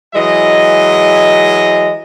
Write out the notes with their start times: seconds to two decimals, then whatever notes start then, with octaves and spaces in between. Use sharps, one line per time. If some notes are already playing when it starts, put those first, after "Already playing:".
0.15 E3 F#3 G#3 D#5